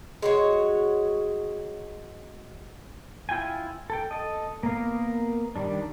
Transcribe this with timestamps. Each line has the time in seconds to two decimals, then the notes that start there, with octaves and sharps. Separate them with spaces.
0.22 G#3 F#4 C#5
3.29 E4 F4 G5 G#5
3.90 A4 G5
4.11 A4 D#5
4.63 A#3 B3 A#4 F5
5.56 D#3 G3 D4